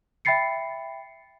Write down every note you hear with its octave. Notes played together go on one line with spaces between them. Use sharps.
E5 G5 B5 A6 C7 C#7